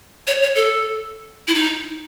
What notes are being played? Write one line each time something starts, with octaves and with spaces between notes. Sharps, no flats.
C#5
C#5
A4
E4
D#4